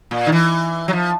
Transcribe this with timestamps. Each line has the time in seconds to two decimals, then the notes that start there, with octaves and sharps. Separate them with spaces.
0.11 A#2
0.27 D#3
0.32 E3
0.88 F#3
0.93 F3